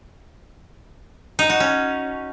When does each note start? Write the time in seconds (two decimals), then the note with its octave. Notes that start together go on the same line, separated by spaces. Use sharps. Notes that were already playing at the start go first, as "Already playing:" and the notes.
1.39 D#4
1.50 F#4
1.60 C#4